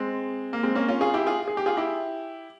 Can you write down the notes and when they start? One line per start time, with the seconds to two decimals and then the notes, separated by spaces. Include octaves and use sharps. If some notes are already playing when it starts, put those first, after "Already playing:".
Already playing: G#3 C4
0.53 A#3
0.63 G#3 C4
0.75 A#3 C#4
0.88 C#4 F4
1.01 F4 G#4
1.14 E4 G4
1.26 F4 G#4
1.48 G#4
1.57 G4
1.66 F4 G#4
1.77 E4 G4